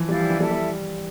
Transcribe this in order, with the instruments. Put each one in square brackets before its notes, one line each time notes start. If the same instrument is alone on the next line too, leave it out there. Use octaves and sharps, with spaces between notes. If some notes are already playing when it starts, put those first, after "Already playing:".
Already playing: [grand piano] E3 F3
[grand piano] G3 [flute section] E4 G4 D5 F5
[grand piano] F3
E3
[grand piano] G3 [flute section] E4 A4 E5
[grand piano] G3